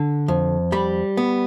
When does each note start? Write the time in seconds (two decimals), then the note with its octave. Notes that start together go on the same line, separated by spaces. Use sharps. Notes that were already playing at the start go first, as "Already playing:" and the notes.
Already playing: D3
0.28 F2
0.72 G3 B5
1.17 B3